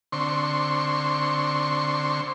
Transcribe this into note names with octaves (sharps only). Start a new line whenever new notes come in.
D3 C4 C6 C#6